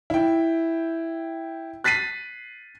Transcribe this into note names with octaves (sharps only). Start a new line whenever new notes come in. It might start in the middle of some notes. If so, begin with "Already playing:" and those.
E4 G5
F#6 A6 B6 C7 D#7